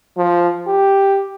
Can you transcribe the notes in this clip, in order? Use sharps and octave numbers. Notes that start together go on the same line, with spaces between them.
F3
G4